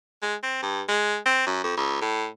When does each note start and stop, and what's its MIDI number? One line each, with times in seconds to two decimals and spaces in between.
0.23 0.35 56
0.43 0.58 60
0.62 0.82 43
0.88 1.17 56
1.26 1.44 60
1.47 1.64 42
1.64 1.77 41
1.77 2.00 37
2.01 2.27 45